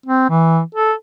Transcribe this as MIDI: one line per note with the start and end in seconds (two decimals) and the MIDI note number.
0.06 0.27 60
0.30 0.61 52
0.75 0.93 69